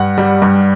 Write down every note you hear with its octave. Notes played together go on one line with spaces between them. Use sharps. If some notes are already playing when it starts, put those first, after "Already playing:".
Already playing: G2 F#5
G3
G2